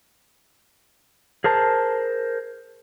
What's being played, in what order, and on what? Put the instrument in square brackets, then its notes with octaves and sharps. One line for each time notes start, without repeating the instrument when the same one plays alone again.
[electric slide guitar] G#4 A#4 C5 A5